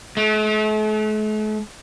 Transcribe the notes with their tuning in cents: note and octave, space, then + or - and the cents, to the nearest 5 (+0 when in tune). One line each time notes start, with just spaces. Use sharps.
A3 -45